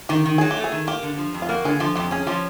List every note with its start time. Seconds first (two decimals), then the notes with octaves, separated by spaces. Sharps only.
0.09 D#3 G4
0.25 D#3
0.38 F#3 G#4
0.51 G4
0.57 A3
0.64 G#4
0.72 D#3
0.87 A#3 G4
1.03 D3
1.18 F3
1.34 F2
1.42 F4
1.49 A#3 F#4
1.64 D3 G#4
1.80 F3 G4
1.96 F2 G4
2.11 C#4 G#4
2.27 F3 G4